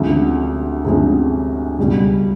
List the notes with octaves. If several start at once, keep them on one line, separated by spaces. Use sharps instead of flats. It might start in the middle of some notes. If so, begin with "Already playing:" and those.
Already playing: D2 C3 F3 G#3 C#4
D2 C3 F3 G#3 C#4
C#2 B2 G3